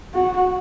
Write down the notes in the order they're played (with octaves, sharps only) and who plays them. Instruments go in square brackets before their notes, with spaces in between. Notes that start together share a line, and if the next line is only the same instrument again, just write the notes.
[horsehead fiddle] F#4